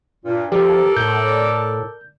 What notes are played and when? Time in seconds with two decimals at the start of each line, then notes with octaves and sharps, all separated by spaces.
0.25 G2 A#2
0.52 F3 G4 A4 A#4 D5
0.97 A2 G6